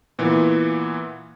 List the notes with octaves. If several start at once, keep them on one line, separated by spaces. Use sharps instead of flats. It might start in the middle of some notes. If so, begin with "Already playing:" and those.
A#2 E3 B3